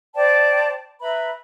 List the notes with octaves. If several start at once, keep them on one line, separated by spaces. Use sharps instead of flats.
C5 D5 G5 A5
B4 E5 A#5 B5